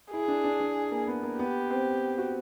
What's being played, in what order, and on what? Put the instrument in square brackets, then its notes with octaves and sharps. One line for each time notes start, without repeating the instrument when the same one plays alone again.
[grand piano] E4 [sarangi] G#4
[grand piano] D4
D4
D4
A#3
B3
A#3
[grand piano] B3 [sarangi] G4
[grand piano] C4
F#4